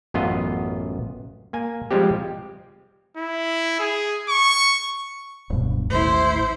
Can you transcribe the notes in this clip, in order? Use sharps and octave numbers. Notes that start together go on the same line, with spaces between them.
A1 F#2 B3 F4 D#5
A#3 G#5
F3 G3 G#3 C4 G4
E4
G#4
C#6
D1 G2 B2
A1 D#2 A2 E4 C5